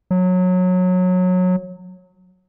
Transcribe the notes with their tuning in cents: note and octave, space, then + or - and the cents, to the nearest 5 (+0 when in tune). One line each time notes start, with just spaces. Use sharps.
F#3 -20